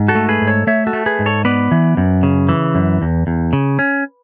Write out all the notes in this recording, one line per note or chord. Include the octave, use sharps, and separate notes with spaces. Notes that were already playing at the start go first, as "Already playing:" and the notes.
Already playing: G#2
F#4 A4
A3
G#4 B4
G#2
A4 C#5
A3 C#5 E5
F#4 A4
A3
G#4 B4
G#2
A4 C#5
B3 B4 D5
E3
F#2
C#3
E3
F#2
E2
E2
C#3
C#4